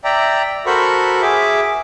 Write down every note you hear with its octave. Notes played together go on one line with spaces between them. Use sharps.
D5 E5 G5 A#5
F#4 A4 A#4 C5 B5 C#6
G#4 E5 D6